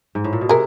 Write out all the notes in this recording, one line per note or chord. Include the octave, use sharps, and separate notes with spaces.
G#2
A2
A#2
B2
C3 G#4 A#4